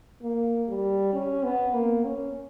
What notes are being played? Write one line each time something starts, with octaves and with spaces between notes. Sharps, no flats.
A#3
G3
C#4
B3
A#3
C#4